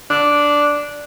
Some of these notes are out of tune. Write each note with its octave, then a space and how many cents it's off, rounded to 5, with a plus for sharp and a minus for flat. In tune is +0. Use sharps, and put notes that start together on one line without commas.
D4 -5